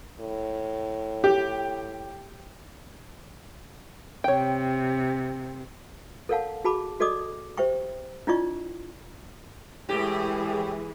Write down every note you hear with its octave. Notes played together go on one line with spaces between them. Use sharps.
A2
G4
C3 C#5 G5
A4 A#4 C#5 F5 F#5 A5
F#4 G#4 A5 B5 D6
F#4 A4 D5 D#5 D6 D#6
G4 C5 E5 G5 C#6
D4 E4 F4 D5 D#5 C#6
A2 E3 G#3 G4 G#4